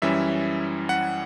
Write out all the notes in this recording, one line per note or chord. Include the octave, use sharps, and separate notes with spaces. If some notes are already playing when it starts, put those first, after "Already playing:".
F#2 E3 G3 C#4 E4 E5
F#5